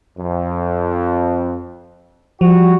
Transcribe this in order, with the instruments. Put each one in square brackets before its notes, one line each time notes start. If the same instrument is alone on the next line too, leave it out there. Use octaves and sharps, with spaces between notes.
[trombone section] F2
[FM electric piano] F3 [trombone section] G3 F#4